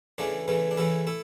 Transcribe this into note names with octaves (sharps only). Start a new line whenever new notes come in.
E2 C#3 E3 A3 D4
E2 C#3 E3 A3
D4
E2 C#3 E3 A3 E4
A3 E4